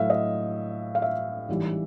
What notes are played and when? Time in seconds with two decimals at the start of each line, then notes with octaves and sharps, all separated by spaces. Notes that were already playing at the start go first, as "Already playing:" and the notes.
Already playing: A2 F#3 E5 F5
0.10 D#5
0.95 F5
1.02 E5
1.49 A1 G#2 E3 G3